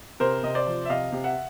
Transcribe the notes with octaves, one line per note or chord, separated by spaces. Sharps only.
C3 A#4 C5
C3 D#5
C5 D5
F3
E5
C3 D#5 F5
C3
E5 F#5